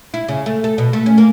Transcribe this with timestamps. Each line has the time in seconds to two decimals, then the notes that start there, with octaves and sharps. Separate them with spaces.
0.14 E4
0.28 C#3
0.46 A3
0.64 A4
0.78 B2
0.93 A3
1.06 C#4
1.18 A#3